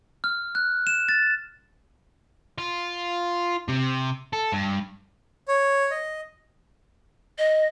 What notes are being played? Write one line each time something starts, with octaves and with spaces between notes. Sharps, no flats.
F6
F#6
E7
A6
F4
C3
A4
G2
C#5
D#5
D#5